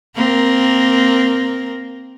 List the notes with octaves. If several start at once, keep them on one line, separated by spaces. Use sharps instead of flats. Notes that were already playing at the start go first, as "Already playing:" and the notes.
A#3 C4 A#4